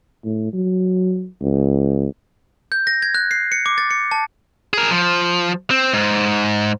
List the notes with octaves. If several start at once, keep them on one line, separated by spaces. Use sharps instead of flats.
A2
F#3
C#2
G6
A#6
G#6
F#6
C7
C#7
D6
A6
C#7
A5
G#4 A#4
F3
C4
G#2